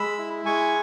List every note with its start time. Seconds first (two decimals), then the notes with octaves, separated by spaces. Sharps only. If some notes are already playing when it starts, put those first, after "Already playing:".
Already playing: G#3 B5 E6
0.19 E4
0.45 G#3 G#5 C#6